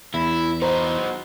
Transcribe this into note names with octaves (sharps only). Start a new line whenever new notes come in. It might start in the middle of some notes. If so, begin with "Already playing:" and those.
E2 E4
D#4 F#4 C5 A#5